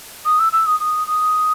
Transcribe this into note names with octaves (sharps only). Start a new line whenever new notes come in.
D#6
E6
E6
D#6
D#6
D#6